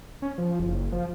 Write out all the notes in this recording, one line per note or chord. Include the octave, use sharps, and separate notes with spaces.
C#4
F3
F#1
F3